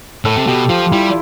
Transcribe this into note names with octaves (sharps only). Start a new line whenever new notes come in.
A2 A4
C3
B2 G4
F3 F4
G3 E4